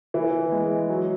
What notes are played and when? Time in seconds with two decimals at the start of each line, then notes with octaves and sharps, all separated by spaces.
0.14 E3
0.52 G#3
0.89 F#3